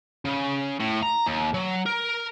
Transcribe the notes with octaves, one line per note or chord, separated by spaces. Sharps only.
C#3
A2
A#5
D#2
F#3
A#4